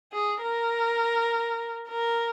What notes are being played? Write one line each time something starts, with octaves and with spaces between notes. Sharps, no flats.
G#4
A#4
A#4